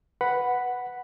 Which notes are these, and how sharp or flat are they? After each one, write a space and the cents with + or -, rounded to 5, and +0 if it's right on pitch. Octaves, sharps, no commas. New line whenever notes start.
B4 +0 F#5 +0 B5 +0